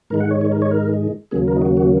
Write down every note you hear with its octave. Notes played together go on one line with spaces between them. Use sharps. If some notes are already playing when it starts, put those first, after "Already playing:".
G#2 D#3 G#3 A#4
F#5
C#5
C#5
A#4
C#5
A#4
D#2 C#3 F#3 A#3 G#4
A#4
D#4
F#4
F#4